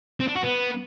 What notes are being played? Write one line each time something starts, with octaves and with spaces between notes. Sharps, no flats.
C4
D4
F#4
B3